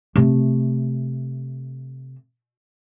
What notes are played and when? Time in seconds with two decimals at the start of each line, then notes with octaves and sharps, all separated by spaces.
0.16 C3 A3